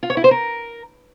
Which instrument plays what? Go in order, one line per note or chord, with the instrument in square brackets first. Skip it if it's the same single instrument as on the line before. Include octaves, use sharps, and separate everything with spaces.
[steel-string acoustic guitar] F4
C#5
E4
C5
A#4